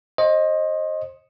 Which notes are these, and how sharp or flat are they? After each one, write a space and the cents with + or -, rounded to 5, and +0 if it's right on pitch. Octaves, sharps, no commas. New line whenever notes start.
C5 +30 D#5 +0